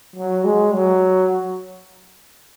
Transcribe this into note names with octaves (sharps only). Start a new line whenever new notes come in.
F#3
G#3
F#3